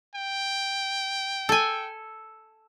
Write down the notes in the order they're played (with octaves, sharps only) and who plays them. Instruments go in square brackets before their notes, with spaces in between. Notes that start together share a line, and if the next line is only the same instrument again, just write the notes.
[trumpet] G5
[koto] A4 G#5